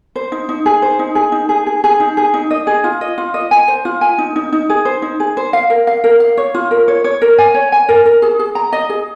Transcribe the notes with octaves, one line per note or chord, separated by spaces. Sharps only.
C5
D#4
D#4
G#4
C5
D#4
G#4
D#4
G#4
G#4
G#4
D#4
G#4
D#4
D#5
G#4
F4
D#5
F4
D#5
G#5
C5
F4
G#5
D#4
D#4
D#4
G#4
C5
D#4
G#4
C5
F5
A#4
F5
A#4
F5
C#5
F4
A#4
C#5
C#5
A#4
G#5
C#5
G#5
A#4
A#4
G#4
G#4
A#5
D#5
G#4